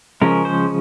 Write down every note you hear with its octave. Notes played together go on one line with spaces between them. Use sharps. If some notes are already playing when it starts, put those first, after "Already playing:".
C#3 F3 G#3 C#4 A#4
C5